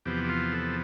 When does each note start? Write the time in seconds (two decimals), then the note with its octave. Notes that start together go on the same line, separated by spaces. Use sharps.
0.06 E2 C3 F3 B3 G4
0.24 G4
0.29 F4
0.52 A4